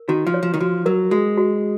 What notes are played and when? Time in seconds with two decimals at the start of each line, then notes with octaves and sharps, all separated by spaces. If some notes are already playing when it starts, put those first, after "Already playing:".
Already playing: A#4
0.08 D#3 F#4
0.27 F3
0.34 C#5
0.43 F3
0.54 D#3
0.60 F3 F#4
0.86 F#3 A#4
1.11 G#3 F#4
1.38 F#4